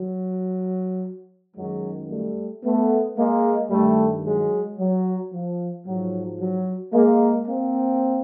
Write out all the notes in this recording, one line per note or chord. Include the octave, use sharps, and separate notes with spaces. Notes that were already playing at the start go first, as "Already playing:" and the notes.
Already playing: F#3
F#2 D#3 F#3 G#3
G3 A3
A3 B3
G#3 A#3
G2 D#3 G3 A3
F#3 G#3
F#3
F3
G#2 F3 F#3
F#3
G#3 A#3
A#3 C4